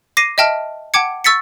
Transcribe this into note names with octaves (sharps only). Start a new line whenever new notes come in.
D6 A#6 C7 D#7
D#5 E5 G5 A5 F6
F#5 G5 A5 D6 G#6 C#7
C#6 E6 A6 B6 C#7